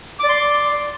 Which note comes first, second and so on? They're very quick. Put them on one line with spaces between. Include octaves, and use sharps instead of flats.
D6 D5 C6